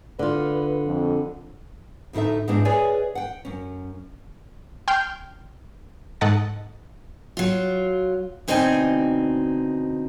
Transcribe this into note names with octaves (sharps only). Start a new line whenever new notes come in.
D3 F4 B4
F2
D2 A2 D#4 A4 E5
G#2 G#3 B3 C4 D4 E4
G#4 B4 C#5 D5 E5 G#5
F#5 G5
F#2 C#4
G5 C6 F6 G6
G#2 A4 D#5 F#5 A6
F#3 F4
D2 B2 C4 D#4 G#4 G#5